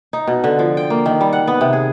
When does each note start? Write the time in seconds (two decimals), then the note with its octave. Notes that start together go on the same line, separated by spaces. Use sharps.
0.13 D#4
0.27 B2
0.44 D3
0.59 F3
0.77 G5
0.90 A#3
1.06 D#3
1.21 G3
1.33 F#5
1.47 B3
1.61 C3
1.73 G#4